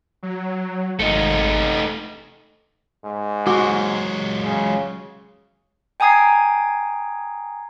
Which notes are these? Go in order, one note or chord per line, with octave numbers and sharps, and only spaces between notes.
F#3
G#1 A3 D#4
G#2
F#3 G#3 F#4
C#3
G5 G#5 A#5 D#6 G#6 C7